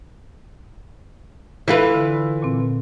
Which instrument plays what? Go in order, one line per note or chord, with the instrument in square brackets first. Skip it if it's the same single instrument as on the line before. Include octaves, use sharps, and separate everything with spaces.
[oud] E3 F4 B4 [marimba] A4 E5
[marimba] D3
A#2 C4